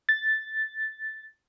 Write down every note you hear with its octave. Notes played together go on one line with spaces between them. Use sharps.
A6